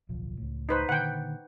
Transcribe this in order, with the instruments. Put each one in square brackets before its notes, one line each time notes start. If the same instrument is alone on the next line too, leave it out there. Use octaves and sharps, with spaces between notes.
[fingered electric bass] D1 B1 F3
C#2 A2
[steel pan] D#4 B4 C5
[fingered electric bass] A#2 D3 D#3 [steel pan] F#5 G5